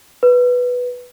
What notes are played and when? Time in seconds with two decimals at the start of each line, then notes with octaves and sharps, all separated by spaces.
0.23 B4